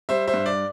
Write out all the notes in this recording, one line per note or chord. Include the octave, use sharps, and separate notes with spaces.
G3 C5 E5
C5 E5
G2
D5